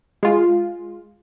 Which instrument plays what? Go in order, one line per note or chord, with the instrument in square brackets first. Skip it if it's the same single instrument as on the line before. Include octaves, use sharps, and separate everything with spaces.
[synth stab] G#3 F4